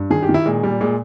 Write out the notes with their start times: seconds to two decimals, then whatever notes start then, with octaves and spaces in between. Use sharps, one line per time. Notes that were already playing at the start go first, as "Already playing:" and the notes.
Already playing: G2
0.10 D#3 G#4
0.23 G4
0.29 D#3
0.34 E4
0.46 A#2 G#3
0.63 A#2 G3
0.81 A#2 G#3